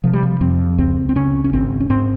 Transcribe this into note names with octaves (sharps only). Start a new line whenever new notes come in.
C3 F3
G3
F3
F2 C4
C#2 C4
C4
C#3 C#4
C#4
G#1 C4
C#4
G#2 C4